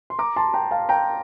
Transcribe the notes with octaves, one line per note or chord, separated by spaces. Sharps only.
C6
A#5 D6
A5 C6
G5 A#5
F5 A5
G5 A#5